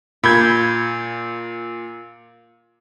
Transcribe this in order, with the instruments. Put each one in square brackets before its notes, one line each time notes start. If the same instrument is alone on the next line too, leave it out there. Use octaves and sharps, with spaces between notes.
[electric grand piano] A#2 [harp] B5 G6 G#6